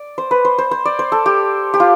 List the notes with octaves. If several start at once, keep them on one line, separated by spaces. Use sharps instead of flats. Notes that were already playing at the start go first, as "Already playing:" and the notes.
Already playing: D5
C5
B4
C5
C5
C5
D5
C5
A4
G4
G4
F4